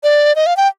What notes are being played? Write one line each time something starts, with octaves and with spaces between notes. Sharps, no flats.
D5
D#5
F5
G5